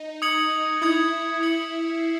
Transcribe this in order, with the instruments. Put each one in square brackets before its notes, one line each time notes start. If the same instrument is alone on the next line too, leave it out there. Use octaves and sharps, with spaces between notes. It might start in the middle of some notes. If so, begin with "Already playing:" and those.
Already playing: [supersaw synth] D#4
[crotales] D#6 G#6 C#7 F#7
[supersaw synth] E4 [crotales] D#6 G#6 C#7 F#7
[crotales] D#6 G#6 C#7 F#7
G#6 C7